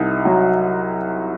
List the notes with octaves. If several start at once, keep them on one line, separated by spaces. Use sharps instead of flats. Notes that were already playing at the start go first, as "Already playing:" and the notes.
Already playing: C2 D#4
F#3